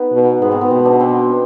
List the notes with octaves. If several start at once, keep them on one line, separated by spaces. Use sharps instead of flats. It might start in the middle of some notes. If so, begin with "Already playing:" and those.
Already playing: B3 D#4 B4
B2
G#2 B3
C4
B3
B2 C4
D4
C4